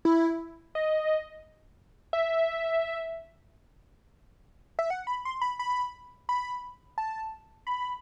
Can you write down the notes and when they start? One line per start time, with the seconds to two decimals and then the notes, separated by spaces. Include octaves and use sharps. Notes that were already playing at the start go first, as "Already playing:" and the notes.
0.05 E4
0.75 D#5
2.13 E5
4.79 E5
4.90 F#5
5.07 B5
5.25 C6
5.41 B5
5.59 B5
6.29 B5
6.98 A5
7.67 B5